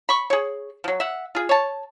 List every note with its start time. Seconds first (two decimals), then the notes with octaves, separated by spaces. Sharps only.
0.09 B5 C#6
0.30 G#4 C#5
0.84 F3 F#3
1.00 E5 F#5
1.35 F4 G#4
1.49 C#5 A5